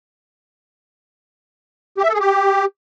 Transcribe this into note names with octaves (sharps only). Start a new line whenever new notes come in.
G4
E5
A4
G#4
G4